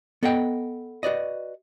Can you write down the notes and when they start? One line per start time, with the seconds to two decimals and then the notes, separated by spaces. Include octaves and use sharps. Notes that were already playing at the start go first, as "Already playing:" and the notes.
0.23 B3 A4 D#5 F#5 G5
1.03 F#4 B4 D5 D#5